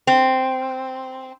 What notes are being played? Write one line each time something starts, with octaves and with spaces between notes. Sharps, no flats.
C4